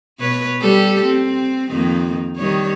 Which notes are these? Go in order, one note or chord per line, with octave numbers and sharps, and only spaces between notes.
B2 B4 C#5
G3 G4 A4
C4
F2 D#3 A#3
D#3 G3 C#5